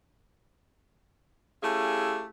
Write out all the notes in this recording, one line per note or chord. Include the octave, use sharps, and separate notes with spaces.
A3 C#4 E4 G4 G#4 F5